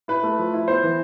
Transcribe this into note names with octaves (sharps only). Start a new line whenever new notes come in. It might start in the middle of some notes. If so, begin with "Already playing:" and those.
E4 B4
A3
F3
E4
B3 C5
E3